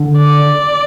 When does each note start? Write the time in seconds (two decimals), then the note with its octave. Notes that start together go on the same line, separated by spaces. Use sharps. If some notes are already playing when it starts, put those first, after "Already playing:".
Already playing: D3
0.18 D5